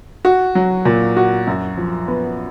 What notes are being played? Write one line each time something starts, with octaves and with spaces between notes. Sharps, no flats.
F#4
F#3
A#2
F#4
F#2
F3
B3